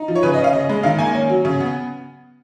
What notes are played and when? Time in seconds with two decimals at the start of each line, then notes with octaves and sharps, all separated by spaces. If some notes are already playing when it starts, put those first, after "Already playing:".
Already playing: D#4
0.08 F3
0.15 C#5
0.23 C#3 B4
0.34 D#5
0.38 C#4
0.44 F5
0.53 C#3 D#5
0.69 G#3
0.83 D#3 F5
0.99 A#3 G#5
1.15 C#4
1.30 F#3
1.45 C#3
1.60 B3